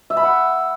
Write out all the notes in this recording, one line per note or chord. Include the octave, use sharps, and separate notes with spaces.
E5
B5
F#5